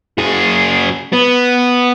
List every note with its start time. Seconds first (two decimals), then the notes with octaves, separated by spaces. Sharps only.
0.18 F#2 G#4
1.13 B3